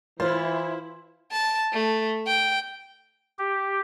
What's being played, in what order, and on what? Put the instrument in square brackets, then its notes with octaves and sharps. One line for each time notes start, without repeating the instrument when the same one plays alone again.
[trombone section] E3 [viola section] E4 [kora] F4 [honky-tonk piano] C5
[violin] A5
A3
G5
[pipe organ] G4